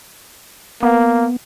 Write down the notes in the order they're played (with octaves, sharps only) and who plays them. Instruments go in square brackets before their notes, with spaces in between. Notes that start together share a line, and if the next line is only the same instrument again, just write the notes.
[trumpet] A#3 [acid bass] B3